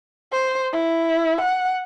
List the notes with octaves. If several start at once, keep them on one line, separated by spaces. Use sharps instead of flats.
C5
E4
F#5